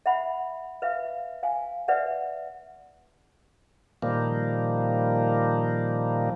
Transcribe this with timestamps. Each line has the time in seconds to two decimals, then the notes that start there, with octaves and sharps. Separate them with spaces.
0.06 E5 F#5 B5
0.82 B4 E5 F5
1.43 F5 G#5
1.88 B4 D5 E5 F#5
4.02 A#2 D#3 F3 G3 A#3